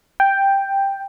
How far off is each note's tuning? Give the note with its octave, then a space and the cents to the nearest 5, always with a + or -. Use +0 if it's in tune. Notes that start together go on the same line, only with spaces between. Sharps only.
G5 +5